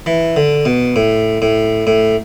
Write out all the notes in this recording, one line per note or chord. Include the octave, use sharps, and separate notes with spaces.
E3
D3
B2
A2
A2
A2